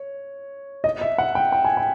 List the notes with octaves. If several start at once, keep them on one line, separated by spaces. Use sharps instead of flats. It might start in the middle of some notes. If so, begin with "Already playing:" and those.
Already playing: C#5
D#5
E5
F#5
G5
G5
G#5
G5